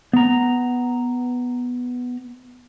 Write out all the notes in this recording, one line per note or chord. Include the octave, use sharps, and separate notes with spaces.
B3 A#5